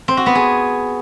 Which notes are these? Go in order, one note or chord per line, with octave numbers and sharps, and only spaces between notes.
C4
F#4
B3
G#4